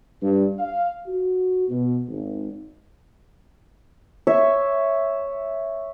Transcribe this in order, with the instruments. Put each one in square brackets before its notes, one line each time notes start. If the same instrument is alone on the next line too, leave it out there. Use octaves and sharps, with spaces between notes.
[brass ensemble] G2
F5
F#4
B2
G#1
[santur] C#5 E5 C#6